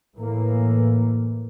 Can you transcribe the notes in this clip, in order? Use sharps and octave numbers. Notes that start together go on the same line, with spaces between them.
A2 E3 A#3